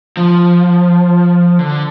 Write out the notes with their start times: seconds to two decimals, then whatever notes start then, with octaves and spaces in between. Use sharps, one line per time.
0.17 F3
1.59 D3